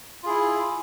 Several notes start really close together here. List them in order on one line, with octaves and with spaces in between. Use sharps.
F4 G#4 E4